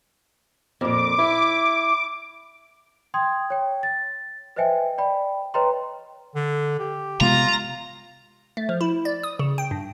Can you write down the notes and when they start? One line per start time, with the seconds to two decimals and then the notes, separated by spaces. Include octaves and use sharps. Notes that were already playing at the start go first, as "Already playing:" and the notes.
0.81 F2 A#2 D6
1.18 E4
3.14 G5 C6 D#6 G#6
3.50 C#5 G5
3.83 A6
4.56 B4 C5 D#5 E5 G5 G#5
4.98 D5 G5 B5
5.54 B4 C#5 D#5 G5 A#5 C6
6.35 D3
6.79 G4
7.21 C3 G#3 B3 F4 A#5
8.57 A3
8.69 F3
8.81 E4
9.05 D5
9.23 D#6
9.39 C#3
9.58 G5
9.71 G2